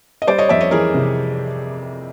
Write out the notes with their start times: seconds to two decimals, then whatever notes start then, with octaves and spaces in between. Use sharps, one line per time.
0.22 D#5
0.27 G3 C5 D5
0.38 C#5 D#5
0.49 F2 D5 E5
0.61 C#5 D#5
0.71 E3 G#4 A#4
0.94 C3